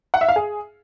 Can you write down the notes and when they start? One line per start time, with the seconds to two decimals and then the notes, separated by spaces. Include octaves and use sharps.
0.14 F#5
0.21 E5
0.29 F5
0.36 G#4